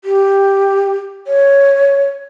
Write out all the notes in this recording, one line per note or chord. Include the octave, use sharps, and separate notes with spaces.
G4
C#5